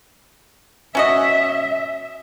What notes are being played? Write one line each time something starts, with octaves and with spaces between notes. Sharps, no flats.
C#4 F#4 D#5 E5